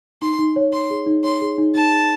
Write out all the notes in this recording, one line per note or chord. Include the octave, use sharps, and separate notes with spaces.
D#4 C6
D#4
C#5
C#5 C6
G#4
D#4
C#5 C6
G#4
D#4
D#4 A5
G#4